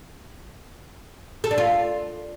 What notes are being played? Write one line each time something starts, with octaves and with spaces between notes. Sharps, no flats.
A4
D4
F4